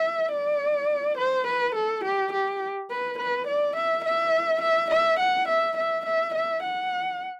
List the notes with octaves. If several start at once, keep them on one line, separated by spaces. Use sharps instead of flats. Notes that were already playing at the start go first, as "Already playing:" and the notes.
Already playing: E5
D5
C5
B4
A4
G4
G4
B4
B4
D5
E5
E5
E5
E5
F#5
E5
E5
E5
E5
F#5